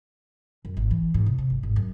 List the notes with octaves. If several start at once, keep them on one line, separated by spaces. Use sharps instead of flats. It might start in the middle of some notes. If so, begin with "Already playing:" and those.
F#2
G#1
E3
G#2
C3
C3
G1
G#1
F#2